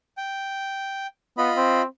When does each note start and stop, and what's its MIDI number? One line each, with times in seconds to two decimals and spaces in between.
0.17 1.07 79
1.38 1.50 59
1.38 1.82 65
1.38 1.82 75
1.38 1.82 83
1.56 1.84 60